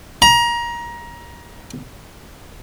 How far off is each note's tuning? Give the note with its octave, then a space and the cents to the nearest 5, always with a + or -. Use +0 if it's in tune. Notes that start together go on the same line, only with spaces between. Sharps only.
A#5 +25